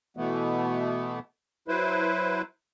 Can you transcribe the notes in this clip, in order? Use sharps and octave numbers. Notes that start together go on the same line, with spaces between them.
B2 E3 A3 B3
F#3 E4 B4 C5